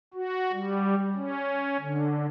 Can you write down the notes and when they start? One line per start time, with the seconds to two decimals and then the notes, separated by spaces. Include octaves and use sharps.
0.14 F#4
0.53 G3
1.15 C#4
1.80 D3